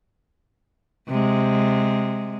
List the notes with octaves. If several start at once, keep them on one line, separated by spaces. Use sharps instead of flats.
C3 G#3